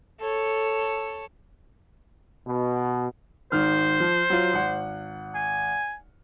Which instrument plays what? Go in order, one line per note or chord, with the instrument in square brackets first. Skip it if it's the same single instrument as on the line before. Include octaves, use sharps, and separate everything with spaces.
[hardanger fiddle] A4 C#5
[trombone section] B2
[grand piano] G#1 D#3 F6 [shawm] C5
[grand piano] F3
F#3 F4
G#1 F#5
[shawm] G#5